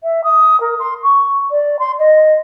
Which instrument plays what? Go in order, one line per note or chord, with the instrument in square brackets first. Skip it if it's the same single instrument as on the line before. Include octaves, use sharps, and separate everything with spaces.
[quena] E5
D#6
A#4
C6
C#6
D5
C6
D#5